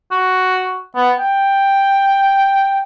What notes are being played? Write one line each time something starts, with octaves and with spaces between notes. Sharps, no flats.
F#4
B3
G5